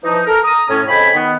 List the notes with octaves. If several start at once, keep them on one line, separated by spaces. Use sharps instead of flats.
E3 F3 D#4
A4 A#4
A#5 D#6
A2 C#4
F2 C#3 D#5 G5 G#5 B5
D#3 B3